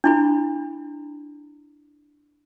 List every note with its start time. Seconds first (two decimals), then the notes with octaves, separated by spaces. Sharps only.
0.04 D4 E4 B5